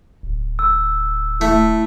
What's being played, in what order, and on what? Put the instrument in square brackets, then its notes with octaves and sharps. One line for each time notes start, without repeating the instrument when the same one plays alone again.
[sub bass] D1
[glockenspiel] E6
[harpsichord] A3 [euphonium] E4